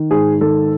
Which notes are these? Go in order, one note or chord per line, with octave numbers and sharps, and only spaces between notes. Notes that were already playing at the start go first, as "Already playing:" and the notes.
Already playing: D#3
G#2 G#4
D#3 A4